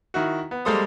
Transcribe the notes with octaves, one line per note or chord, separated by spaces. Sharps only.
D#3 E4 F#4
B3
G3 G#3 A#3 A4 C5 D#6